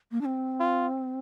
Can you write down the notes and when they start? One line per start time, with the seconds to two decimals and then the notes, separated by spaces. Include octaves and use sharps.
0.12 A#3
0.21 D4
0.25 C4
0.60 F4